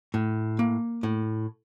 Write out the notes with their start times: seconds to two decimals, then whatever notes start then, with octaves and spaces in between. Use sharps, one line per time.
0.14 A2
0.59 A#3
1.03 A2